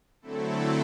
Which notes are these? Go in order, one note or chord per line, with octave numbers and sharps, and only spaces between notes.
D3 F#3 A3 C4 E4 A4